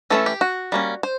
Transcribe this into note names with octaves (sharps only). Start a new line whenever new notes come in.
E3 A3 C#4 A4
G4
F#4
G3 A#3 C#4
C5